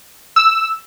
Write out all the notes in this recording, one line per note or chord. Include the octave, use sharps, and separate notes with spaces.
E6